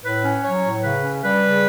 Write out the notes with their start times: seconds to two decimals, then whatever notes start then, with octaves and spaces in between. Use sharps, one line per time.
0.03 A2 B4
0.23 C#4
0.43 F#3 C#5
0.63 A2
0.83 C#3 B4
1.03 C#4
1.23 G3 B4
1.42 C#3